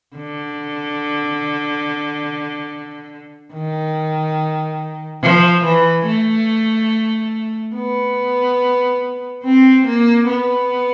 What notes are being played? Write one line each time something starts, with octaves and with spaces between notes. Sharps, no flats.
D3
D#3
F3
E3
A3
B3
C4
A#3
B3